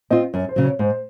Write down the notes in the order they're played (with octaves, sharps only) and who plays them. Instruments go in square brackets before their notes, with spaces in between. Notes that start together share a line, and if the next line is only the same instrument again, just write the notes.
[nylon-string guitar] C4 F4 [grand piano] D#5
[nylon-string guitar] F#2 [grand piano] C#5
[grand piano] C5
[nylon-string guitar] C#3 F#3
[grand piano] C#5
[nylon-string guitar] G#2 [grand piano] C5